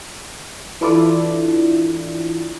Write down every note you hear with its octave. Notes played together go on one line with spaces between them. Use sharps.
E3 D4 E4 F4 A4 D5